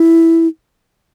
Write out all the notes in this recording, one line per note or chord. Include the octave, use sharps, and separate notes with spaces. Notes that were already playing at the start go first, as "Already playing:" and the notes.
Already playing: E4